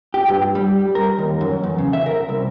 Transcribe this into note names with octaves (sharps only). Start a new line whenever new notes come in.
G4
G2
G3
A#4
D#2
F#2
E2
C#3
E5
A#4
C2